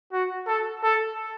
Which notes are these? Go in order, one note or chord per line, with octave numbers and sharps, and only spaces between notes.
F#4
A4
A4